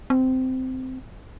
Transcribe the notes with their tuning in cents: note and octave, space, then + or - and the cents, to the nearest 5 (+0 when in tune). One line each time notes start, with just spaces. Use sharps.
C4 -15